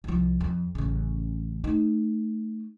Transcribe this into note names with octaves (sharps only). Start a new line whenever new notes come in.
C2 F3
F2
A1 C#3
A3 D#4